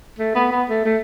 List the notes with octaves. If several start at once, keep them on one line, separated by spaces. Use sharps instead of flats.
A3
B3
B3
A3
A3